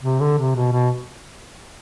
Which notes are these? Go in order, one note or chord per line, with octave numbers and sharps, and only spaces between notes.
C3
D3
C3
B2
B2